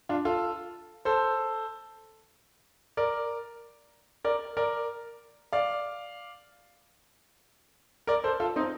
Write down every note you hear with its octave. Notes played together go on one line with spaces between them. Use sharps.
D4 F4
F4 A4
A4 C5
A#4 D5
A#4 D5
A#4 D5
D5 F5
A#4 D5
A4 C5
F4 A4
C4 D#4